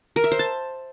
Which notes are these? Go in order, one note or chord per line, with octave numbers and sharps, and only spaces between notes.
A#4
E5
C5
A5